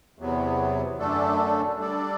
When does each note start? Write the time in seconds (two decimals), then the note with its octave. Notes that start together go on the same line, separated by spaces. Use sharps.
0.19 E2 C3 F#3 B3
0.98 F#2 D3 A3 D4 A4
1.78 G3 D4 A4 D5